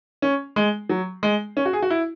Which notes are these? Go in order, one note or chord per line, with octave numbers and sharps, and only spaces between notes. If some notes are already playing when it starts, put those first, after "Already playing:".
C#4
G#3
F#3
G#3
C#4
F#4
G#4
F#4
E4